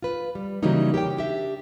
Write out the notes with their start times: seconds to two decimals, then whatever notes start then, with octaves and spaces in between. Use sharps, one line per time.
0.02 F4 B4
0.35 G3
0.63 C#3 E3 F#3 G3 A#3 D#4
0.94 G4 A#4 C#5 G5
1.17 D4 G4 E5